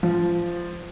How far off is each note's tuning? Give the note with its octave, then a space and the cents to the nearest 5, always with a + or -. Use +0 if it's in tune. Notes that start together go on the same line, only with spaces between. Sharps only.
F3 -10